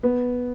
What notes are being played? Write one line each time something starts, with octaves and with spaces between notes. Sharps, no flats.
B3